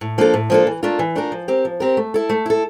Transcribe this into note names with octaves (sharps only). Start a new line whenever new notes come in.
A2
F3 A#3 D4 A4
A2
F3 A#3 D4 A4
E3
A3 D4 F4 A#4
E3
A3 D4 F4 A#4
F3
C4 G4 A#4
F3
C4 G4 A#4
A3
E4 A4
A3
E4 A4